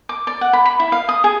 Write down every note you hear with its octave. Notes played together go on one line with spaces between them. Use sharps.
D6
D5
F#5
B5
B5
E4
F5
D#6
G#4